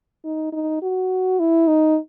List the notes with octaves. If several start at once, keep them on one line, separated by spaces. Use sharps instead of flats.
D#4
D#4
F#4
E4
D#4